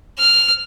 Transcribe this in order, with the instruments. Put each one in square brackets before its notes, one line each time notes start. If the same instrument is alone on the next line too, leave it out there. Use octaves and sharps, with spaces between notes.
[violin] F6